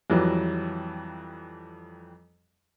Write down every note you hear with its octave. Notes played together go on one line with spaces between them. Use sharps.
F2 E3 F#3 G3